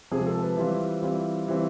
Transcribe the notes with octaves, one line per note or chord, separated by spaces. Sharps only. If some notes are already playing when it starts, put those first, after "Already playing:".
C3 F3 G#3 C4 G#4
A4
B4
E3 G3 C4 F4
E3 G3 C4 F4
E3 G3 C4 F4